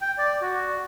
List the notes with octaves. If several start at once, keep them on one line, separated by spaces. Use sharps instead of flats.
G5
D5
F#4